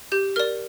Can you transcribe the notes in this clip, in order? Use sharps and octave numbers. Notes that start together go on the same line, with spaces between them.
G4 G6
A#4 D5 F6